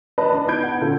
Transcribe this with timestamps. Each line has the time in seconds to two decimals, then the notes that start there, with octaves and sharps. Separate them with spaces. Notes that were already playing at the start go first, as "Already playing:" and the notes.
0.18 B4 D5 D#5 A5
0.33 D4 A5
0.47 B3 D#4 B5 G6 G#6 D7
0.63 F#5
0.81 A#2 D3 C#4 A4